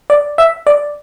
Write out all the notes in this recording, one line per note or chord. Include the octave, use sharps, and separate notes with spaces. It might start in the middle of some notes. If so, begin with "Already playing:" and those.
D5
E5
D5